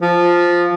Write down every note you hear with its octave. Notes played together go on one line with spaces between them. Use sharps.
F3